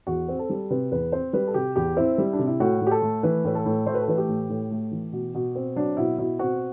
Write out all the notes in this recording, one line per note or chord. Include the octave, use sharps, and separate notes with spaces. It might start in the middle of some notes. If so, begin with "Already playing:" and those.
E2 F#4
C4
A4
G3
C3 B4
E2 B4
C4 C5
G3 B4
A4
C3 G4
E2 G4
C4 E4
G3
D4
C3
E4
A2 F#4
A2
G4
A4
A3
E3 B4
A2 B4
A4
A2
A3 C5
B4
A4
E3 B4
G4
A2
A2
A3
E3
B2
B2
C4
F#3 D4
B2 E4
B2 E4
C4 F#4